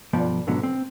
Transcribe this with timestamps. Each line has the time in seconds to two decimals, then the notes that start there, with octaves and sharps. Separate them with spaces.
0.13 B1 G2 F3 B3 D5
0.47 G#2 B2 D3 F#3 B3
0.63 C4